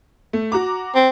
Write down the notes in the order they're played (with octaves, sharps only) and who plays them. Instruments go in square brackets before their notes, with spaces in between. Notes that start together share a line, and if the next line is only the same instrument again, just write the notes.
[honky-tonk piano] A3
F#4 A#5 D6
[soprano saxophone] C4